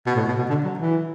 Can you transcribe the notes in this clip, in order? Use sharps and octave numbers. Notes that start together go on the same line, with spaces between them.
B2
A2
B2
B2
D3
F#3
E3